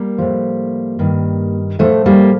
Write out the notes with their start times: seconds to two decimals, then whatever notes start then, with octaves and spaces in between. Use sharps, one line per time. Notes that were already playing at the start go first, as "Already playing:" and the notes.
Already playing: G3 A#3
0.18 A2 F3
0.99 G2 D#3
1.79 A2 F3 A3
2.06 G3 A#3